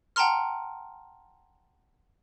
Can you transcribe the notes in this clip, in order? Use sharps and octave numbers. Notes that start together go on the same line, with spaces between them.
F#5 G5 A5 A#5 C6 F6